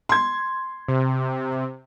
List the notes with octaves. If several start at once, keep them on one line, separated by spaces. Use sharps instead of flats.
C6 G#6
C3